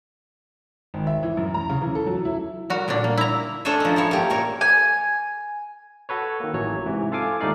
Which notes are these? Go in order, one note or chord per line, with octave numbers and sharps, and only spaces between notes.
G#1
E5
E3
F#2
A#5
C#3
E3
A4
F#3
E4
G3 F#4 A#4
A#2 D3 G3 D4
A#3
E4 A#5
A3 C#4 D4 C5 C#5 E5
F3 D#4
F3 E4 C#5
A#3 G4
A#2 A#4 C#5
G#5
F#4 A4 B4 C#5
D#3 A#3
A1 E3 F#3 C#5
G#2 C3 E3
F4 A4 F5 G#5 D6
D#2 G#2 A3 D#4 D5 F5